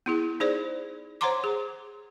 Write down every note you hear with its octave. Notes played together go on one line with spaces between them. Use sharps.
B3 E4 G#4
D#4 G#4 C5 D5
C5 C#5 F#5 A#5 C6 D6
G#4